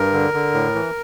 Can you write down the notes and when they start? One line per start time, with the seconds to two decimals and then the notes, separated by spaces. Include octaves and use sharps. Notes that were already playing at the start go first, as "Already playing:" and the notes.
Already playing: G2 A#4
0.13 D3
0.34 D3
0.54 A2
0.75 E3